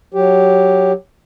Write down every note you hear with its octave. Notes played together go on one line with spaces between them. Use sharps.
F#3 G4